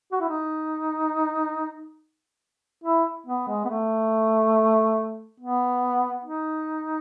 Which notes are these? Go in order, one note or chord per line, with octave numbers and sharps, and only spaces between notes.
F#4
E4
D#4
E4
B3
G#3
B3
A3
B3
D#4